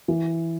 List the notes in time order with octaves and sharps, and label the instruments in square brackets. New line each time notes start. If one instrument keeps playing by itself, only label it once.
[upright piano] E3